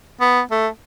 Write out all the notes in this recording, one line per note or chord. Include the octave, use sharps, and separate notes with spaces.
B3
A3